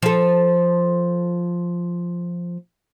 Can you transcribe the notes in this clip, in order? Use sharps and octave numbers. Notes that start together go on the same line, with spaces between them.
F3 A4